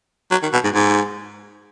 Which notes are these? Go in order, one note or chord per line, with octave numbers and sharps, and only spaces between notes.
F#3
D#3
B2
G#2
G#2